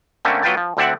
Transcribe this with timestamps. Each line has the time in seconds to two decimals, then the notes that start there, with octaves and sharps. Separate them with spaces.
0.25 D3 A3 A#3 C4 C#4
0.43 F#3 B3 F4 B4 G5 A5
0.57 F3
0.77 D2 D3 C4 D5 E5 F#5